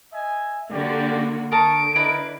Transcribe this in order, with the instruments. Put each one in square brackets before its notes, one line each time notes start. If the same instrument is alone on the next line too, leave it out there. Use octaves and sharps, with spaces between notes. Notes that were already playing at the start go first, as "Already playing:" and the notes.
[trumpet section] D#5 E5 G#5
[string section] D3 A#3 F#4 [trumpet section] G4 D5
[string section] D3 [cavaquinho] A#4 A5 [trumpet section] C#6 D#6 [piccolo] D7
[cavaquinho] E4 B4 B5 [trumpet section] A#4 D5 D#5